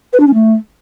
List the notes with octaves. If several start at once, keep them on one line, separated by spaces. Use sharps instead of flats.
B4
D4
C#4
A3